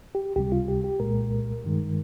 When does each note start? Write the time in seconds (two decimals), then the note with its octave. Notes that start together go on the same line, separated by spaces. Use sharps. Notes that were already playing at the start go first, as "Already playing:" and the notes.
0.15 G4
0.36 C#2 C3 G3 G4
0.52 F4
0.68 G4
0.84 G4
1.00 C2 A#2 G#3 A#4
1.64 G2 D#3 G#3